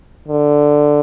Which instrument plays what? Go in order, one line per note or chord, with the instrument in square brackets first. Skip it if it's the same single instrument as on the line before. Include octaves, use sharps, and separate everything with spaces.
[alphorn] D3